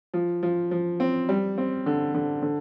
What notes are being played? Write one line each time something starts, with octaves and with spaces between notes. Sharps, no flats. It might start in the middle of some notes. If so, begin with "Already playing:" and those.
F3
F3
F3
C4
G3
C4
D3
D3
D3